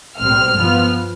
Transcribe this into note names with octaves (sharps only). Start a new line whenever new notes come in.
B1 A2 G3 C4 F6
G2 F3 B3 F4